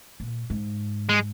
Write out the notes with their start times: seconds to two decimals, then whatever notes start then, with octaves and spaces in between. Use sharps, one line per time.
0.20 A#2
0.50 G#2
1.09 G#3